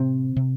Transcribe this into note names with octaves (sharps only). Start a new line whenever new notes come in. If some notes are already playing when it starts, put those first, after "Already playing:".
Already playing: A2 C3 C4
C3